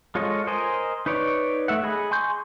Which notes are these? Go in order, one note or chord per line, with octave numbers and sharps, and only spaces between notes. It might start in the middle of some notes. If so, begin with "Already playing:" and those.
G#3 F4 A4 C#5 D#5
A#4 C5 D#5 G#5
D#4 B4 C#5 D5
A3 E5 F#5
G#4 D#5 B5
G#5 C6 C#6 G6